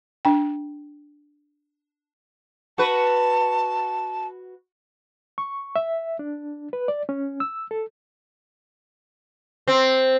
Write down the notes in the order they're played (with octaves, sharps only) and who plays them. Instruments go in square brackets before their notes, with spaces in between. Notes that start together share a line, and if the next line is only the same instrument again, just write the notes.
[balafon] D4 G5
[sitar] F#4 B4 [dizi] A5
[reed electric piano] C#6
E5
D4
B4
D5
C#4
E6
A4
[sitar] C4